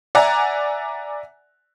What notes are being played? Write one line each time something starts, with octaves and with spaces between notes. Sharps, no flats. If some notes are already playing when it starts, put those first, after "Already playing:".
D5 E5 F#5 G#5 A#5